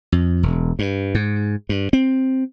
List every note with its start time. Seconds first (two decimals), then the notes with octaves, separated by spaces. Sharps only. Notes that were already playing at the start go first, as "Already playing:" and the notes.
0.12 F2
0.43 E1
0.79 G2
1.15 G#2
1.69 G2
1.93 C4